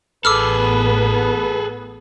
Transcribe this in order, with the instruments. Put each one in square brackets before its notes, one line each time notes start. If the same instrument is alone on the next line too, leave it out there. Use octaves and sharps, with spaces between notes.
[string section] A1 B3 [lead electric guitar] G#4 A4 [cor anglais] B4 [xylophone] D6 E6 F6